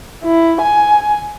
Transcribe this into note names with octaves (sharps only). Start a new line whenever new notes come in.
E4
G#5